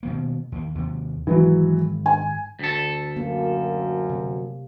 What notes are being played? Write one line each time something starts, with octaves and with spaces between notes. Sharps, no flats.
B2 D#3 A#3
D#2 A#3
D#2 C3
G#2 D#3 E3 F#3 G#3
G#5
D2 A4
F#2 A#3
C3